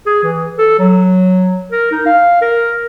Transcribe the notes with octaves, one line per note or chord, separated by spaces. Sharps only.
G#4
E3
A4
F#3
A#4
D#4
F5
A#4